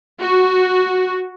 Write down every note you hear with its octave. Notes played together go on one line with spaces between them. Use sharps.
F#4